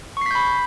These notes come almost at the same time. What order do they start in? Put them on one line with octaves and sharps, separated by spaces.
C#6 C7 B6 G6 B5